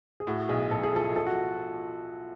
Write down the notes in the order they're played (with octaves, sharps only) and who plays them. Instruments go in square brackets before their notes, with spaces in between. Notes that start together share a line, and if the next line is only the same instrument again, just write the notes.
[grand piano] G#4
[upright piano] A2 [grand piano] F#4
[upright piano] B1 [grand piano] G#4
[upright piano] B1 [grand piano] A4
[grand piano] G#4
[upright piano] F3 [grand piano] A4
[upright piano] F3 [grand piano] A4
[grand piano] F#4